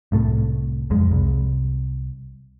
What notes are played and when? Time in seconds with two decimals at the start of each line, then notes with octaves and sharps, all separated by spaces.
0.12 C2 A2 A3
0.90 F#1 F2 G#3
1.12 C2